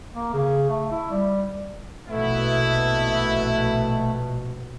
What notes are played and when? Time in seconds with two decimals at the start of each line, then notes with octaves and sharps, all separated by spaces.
0.14 A#3
0.33 C#3
0.69 A3
0.91 E4
1.10 G3
2.08 A#1 B2 A3 B3 E4